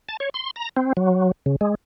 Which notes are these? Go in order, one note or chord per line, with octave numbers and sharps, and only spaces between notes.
A5
C#5
C6
A#5
C4
F#3
C#3
G#3